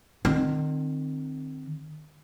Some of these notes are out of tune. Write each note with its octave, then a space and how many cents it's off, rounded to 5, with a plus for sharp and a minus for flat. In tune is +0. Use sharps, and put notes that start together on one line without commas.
D#3 -35 C4 +0